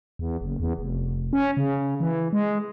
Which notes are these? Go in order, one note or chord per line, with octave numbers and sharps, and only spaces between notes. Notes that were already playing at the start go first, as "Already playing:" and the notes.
E2
F#1
E2
F1
C#4
C#3
E3
G#3